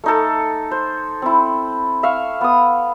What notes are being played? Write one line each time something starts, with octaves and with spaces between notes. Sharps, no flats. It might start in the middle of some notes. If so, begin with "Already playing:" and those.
A3 D#4 A4
C5
C4 E4
E5 F5 C#6
B3 D#6